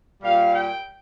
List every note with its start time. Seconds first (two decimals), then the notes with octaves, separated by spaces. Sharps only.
0.22 A#2 G3 F5
0.53 G5